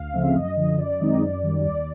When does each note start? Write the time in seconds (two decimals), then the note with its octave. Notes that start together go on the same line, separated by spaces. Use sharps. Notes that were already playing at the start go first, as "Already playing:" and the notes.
Already playing: D2 F5
0.13 C#3 F3 A3 C4 E5
0.35 F#2 D#5
0.57 D3 F3 D#5
0.78 F#2 D5
1.00 D#3 G#3 C4 D#4 D#5
1.22 F#2 D5
1.43 D#3 G3
1.65 D#2 D5